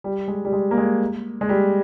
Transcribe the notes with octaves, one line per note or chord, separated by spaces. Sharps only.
G3
G#3
G3
G#3
A#3
G#3
G#3
G3